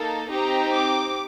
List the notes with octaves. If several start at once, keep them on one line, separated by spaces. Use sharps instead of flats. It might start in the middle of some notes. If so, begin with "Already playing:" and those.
Already playing: A#3 D#4 A4 A5
C4 D#4 G4 A#5
D6